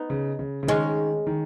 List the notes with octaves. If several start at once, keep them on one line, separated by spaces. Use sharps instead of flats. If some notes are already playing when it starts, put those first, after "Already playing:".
Already playing: B3 D#4
C#3
C#3
C#3
D#3 G#3 C#4
D#3